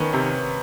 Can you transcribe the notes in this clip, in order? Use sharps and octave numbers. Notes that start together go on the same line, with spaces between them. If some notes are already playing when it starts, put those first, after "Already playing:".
Already playing: D#3 B3 C#4
C3